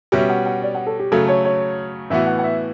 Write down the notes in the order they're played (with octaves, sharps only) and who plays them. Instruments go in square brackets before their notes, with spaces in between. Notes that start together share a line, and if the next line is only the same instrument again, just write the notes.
[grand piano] B2 G3 C#4 [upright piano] E5
[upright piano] F#5
F#5
D5
F#5
A4
G4
[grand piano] C#3 F#3 A3 [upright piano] A4
[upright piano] C#5
C#5
[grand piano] A2 E3 B3 F#4 [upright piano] E5
[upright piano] F#5
F#5
E5